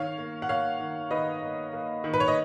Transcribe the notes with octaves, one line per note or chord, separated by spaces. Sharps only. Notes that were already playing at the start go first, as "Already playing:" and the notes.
Already playing: D#3 C#5 F5
A#3
F#5
A#3 C#5 F5
D#3
D#3 B4 D#5
A#3
A#3
D#3
B4
C#5
D#5